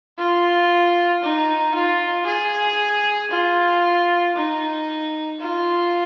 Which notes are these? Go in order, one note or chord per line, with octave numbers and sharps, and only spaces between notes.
F4
D#4
F4
G#4
F4
D#4
F4